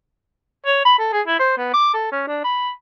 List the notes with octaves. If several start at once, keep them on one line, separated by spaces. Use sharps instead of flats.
C#5
B5
A4
G#4
E4
C5
B3
D6
A4
C#4
D4
B5